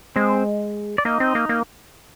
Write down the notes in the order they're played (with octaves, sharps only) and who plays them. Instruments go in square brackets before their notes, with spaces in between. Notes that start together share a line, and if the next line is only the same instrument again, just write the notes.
[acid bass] G#3 [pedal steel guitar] C4 C5
[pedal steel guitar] D5
[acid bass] A#3 [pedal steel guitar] D#4 D#5
[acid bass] C4
A#3
A#3